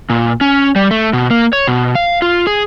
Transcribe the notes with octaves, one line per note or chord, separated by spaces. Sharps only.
A#2
C#4
G3
A3
B2
A#3
C#5
B2
F5
F4
G#4